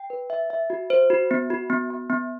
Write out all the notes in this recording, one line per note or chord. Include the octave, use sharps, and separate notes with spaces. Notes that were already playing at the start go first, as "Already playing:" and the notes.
Already playing: G5
B4
E5
E5
F#4
C5
F#4
B3
F#4
B3
B3
B3